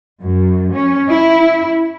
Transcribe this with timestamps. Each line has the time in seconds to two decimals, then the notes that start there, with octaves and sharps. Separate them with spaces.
0.22 F#2
0.74 C#4
1.09 E4